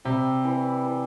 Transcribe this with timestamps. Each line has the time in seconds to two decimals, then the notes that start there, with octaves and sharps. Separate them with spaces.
0.05 C3 G3
0.45 E3
0.84 E3